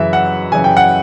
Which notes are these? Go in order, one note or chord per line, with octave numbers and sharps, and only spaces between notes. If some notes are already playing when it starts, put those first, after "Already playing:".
Already playing: F#2 C#3 E3 E5
F#5
F#2 C#3 E3 G#5
G5
F#5